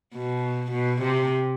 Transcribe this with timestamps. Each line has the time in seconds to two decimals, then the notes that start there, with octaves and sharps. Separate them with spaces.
0.14 B2
0.72 B2
1.02 C3